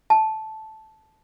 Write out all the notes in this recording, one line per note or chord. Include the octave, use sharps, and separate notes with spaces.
A5